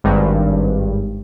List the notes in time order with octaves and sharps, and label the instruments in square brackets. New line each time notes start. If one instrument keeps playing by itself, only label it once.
[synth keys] G#1 G2